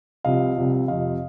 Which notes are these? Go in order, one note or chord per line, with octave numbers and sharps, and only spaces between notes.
C2 C3 F3 D#5 F5
C2 C3 F3
F2 C3 F3 D#5 F5